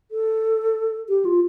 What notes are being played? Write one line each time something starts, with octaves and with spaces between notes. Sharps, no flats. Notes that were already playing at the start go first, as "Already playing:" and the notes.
A4
G4
F4